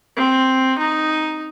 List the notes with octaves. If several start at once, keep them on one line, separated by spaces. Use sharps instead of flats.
C4
D#4